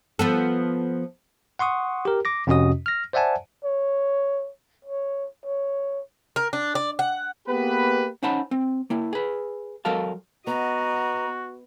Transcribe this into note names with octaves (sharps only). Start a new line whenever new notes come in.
F3 B3 A4
F#5 C6 C#6 D#6
G4 A#4
D6 A#6
F2 C3 C#4 F#4 D#5 D#6
F6 A#6
C5 D5 E5 F#5 G#5 A5
C#5
C#5
C#5
A#4
D4
D5
F#5
A#3 B3 G4 G#4 B4
C#4 D#4 C5 F#5 A5 B5
C4
A#3 E4
G#4 B4
F#3 F#4 A4 A#4 F5 A5
B3 F#4 D#5 A#5